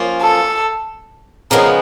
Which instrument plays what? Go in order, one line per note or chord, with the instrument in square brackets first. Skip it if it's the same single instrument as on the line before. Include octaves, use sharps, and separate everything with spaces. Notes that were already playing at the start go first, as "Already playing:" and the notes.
Already playing: [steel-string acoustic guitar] F3 A#3 C#4 F4
[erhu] A4
[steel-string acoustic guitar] C#3 F3 G#3 B3 [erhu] A#4